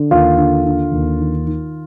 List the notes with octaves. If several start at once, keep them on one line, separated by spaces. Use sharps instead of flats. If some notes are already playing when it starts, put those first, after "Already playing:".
Already playing: D3
D#2 F4
D3
D3
D#2
D#3
D#3